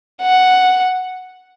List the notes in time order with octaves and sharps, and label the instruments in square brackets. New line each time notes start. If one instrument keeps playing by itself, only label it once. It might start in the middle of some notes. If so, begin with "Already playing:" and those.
[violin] F#5